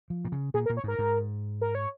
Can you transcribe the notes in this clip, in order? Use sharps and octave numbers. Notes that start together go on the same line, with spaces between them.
F3
A#2
C#3
A#2 G#4
A#4
A#2
C#5
G#2 A#4
G#2
A#4
C#5